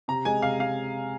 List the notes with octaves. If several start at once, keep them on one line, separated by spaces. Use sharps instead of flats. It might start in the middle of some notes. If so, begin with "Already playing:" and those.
C3 A#5
G#3 G#5
C3 F5
G#3 F5